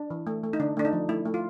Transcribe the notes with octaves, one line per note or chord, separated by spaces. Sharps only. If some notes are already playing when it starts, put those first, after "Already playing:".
Already playing: D4
E3
A3
A3
D#4
D3 D4
A3 D4
D#4
F3
A3 E4
A3
F4